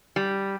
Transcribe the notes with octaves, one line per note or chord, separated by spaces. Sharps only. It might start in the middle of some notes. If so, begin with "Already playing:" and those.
G3